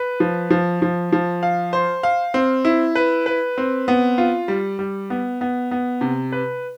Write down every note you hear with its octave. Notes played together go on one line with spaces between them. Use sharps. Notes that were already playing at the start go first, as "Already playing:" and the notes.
Already playing: B4
F3
F3
F3
F3
F5
C5
F5
C4
E4
B4
B4
C4
B3
F4
G3
G3
B3
B3
B3
C3
B4